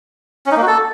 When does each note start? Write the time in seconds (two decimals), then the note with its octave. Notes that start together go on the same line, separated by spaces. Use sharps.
0.46 C#4
0.51 D#4
0.57 A#3
0.62 F#4
0.67 A4